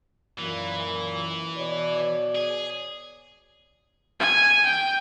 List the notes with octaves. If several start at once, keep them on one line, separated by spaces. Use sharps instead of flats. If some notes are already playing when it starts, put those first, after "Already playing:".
F#2 A#2 E3
B2 C#5 D5
G#4
G#5
G5